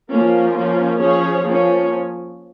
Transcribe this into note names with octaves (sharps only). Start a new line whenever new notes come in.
F3 A#3 C#4 F4 A#4
F3 A#3 C#4
F3 C#4 G#4 C#5
F3 A#3 C#4